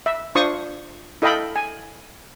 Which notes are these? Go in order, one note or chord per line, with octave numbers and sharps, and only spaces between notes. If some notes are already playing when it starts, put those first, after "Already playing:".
E5
D4 F4 C5 C#6 D#6
E4 A4 D#5 F5 G5 B5
G#5